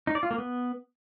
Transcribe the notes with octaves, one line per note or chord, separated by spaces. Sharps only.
D#4
D5
F4
A#3
B3